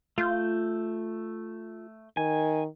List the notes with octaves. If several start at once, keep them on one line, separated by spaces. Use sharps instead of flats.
A3 F4 G6
D#3 G#5